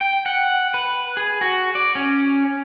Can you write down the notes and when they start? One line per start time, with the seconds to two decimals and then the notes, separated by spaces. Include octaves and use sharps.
0.01 G5
0.26 F#5
0.74 B4
1.17 G#4
1.41 F#4
1.75 D5
1.95 C#4